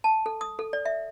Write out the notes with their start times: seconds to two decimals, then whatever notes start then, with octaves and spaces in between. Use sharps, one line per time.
0.04 A5
0.26 A4
0.41 D#6
0.59 A4
0.73 D5
0.85 E5